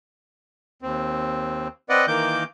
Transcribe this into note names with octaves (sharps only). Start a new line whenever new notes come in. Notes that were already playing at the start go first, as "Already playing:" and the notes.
D#2 C4
C4 B4 D5 D#5 F#5
D#3 E3 A#3 D6 G6